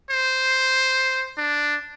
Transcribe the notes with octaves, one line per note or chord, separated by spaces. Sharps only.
C5
D4